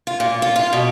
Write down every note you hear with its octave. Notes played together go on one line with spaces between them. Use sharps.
F4
A#2
F4
F4
B2